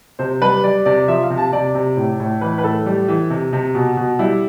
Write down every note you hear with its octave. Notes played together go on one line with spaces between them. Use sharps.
C3 C5
G3 B4
G3 D5
C3 D5
F3 E5
F5
C3
A5
C3 D5
C3
A2
A2
E3 B4
B4
A2 A4
G3
E3
C3
C3
B2
B2
G3 E4